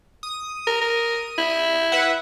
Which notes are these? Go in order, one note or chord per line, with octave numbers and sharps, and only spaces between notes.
D#6
A#4
A#4
E4
B4 E5 F#5